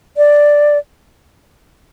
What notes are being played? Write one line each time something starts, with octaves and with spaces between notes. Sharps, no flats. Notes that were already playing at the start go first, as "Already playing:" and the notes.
D5